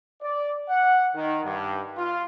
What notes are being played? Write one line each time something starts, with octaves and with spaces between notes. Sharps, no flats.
D5
F#5
D#3
G2
F4